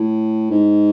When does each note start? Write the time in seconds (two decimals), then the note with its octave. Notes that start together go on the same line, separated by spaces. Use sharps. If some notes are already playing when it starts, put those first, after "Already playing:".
Already playing: A2
0.50 G#2